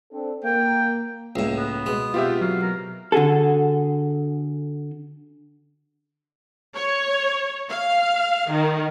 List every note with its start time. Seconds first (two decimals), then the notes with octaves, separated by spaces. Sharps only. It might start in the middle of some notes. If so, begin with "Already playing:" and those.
0.12 C4 D4 A4
0.44 A#3 G5
1.36 C#2 A2 G#3 A#3 F5
1.58 B3
1.86 B2 G#3
2.14 B2 C4 F4 G4 E5 G6
2.41 F#3 F5
2.62 A#4
3.12 D3 F#4 G#4 A4
6.74 C#5
7.69 F5
8.50 D#3